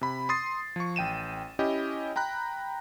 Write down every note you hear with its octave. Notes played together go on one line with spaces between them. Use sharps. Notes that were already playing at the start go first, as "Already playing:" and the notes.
C3 B5
C6 D#6 A6 C7
F3 C#6
A1 G5 D#7 E7
C#4 E4 G4 D#5 G5
G5 A#5 B5 F#6